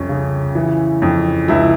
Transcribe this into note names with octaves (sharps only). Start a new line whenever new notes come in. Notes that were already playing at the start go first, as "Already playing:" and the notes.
Already playing: C2 F2 C#4
C#3
E3
F2
C#2 E4